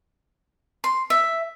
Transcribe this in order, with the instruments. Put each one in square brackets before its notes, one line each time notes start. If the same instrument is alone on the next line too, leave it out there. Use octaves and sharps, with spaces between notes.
[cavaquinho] C6
E5